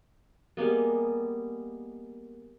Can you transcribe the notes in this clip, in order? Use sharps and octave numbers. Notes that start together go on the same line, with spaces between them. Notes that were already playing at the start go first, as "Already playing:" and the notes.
G3 G#3 A#3 B3